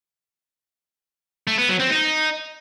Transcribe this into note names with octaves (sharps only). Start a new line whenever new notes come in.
A3
B3
F#3
C4
D#4